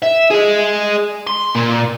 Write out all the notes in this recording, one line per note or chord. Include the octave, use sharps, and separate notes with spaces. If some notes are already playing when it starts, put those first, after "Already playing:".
E5
G#4 D#5
C6
A#2